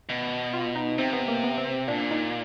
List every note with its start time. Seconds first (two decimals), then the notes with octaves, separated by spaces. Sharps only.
0.09 B2
0.53 F4
0.76 D#4
0.98 C3 C4
1.13 B3
1.28 A#3
1.44 B3
1.58 C4
1.88 A#2 D4
2.11 D#4